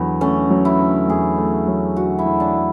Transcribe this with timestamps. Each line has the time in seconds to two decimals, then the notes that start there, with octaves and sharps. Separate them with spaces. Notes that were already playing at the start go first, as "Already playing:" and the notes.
Already playing: E2 D3 F#3 B3
0.21 A3 C#4
0.50 F#3
0.65 E4
0.80 D3
1.09 E2 G#4
1.38 A3
1.67 F#3
1.96 D3 F#4
2.19 E4
2.25 E2
2.40 D4
2.55 A3